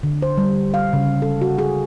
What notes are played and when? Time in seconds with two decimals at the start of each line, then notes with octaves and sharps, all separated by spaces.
0.03 D3
0.22 C5
0.38 G3
0.74 F5
0.93 C#3
1.22 A4
1.42 F#4
1.58 G#4